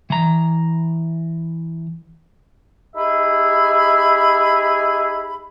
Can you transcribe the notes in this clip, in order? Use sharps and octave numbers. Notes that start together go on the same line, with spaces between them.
E3 A#5
D#4 G4 G#4 E5 B5